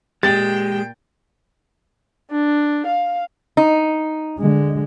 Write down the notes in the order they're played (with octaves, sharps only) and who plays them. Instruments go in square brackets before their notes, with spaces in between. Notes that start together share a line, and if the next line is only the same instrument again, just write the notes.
[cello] A#2 G5 [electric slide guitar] G#3 [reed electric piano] G4 [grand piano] A6
[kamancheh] D4
F5
[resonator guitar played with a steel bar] D#4
[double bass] D3 G#3